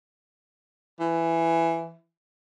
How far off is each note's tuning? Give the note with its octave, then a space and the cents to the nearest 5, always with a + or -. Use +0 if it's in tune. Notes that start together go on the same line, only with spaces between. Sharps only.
E3 +10